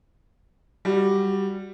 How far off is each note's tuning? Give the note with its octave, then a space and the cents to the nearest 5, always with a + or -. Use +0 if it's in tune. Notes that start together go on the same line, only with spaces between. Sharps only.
G3 +0 F#4 +0